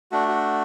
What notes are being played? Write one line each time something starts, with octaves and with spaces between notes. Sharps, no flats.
A3 D4 F#4
F#4